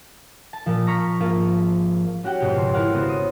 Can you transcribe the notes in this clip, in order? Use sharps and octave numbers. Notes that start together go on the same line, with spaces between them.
A5
A#2 F3
A#5 C#6 F6 B6
G#1 A#3 F4
C#4 F#4 G4 F#5 G5
G#1 F2 B2 G4
C#3 C6
E4 A#4 F5 F#5
C#3 B3 C#4 F#4 C5
D#6